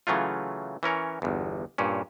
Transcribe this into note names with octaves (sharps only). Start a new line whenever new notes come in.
C#3 E3 F#3 A3 F4
E3 C#4 A#4 C#5
G1 E2
G2 A#2 C#4